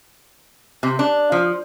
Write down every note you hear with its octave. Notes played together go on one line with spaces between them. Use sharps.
C3
D4
F3